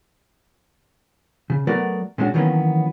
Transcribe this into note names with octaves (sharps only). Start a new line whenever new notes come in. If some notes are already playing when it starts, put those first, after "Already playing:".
C#3
F#3 A3 B3 F#4 A#4 D5
A#2 G#3 C#4 D4 F4 F#4
D#3 E3 F#3 A#3 B3 C#4